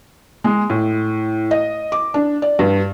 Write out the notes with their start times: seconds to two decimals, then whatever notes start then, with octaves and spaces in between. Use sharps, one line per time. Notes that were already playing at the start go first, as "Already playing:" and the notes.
0.44 G#3
0.70 A2
1.51 D#5
1.92 D6
2.14 D4
2.42 D5
2.59 G2